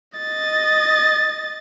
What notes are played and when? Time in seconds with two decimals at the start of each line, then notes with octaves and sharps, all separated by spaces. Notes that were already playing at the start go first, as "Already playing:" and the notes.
0.18 D#5 A6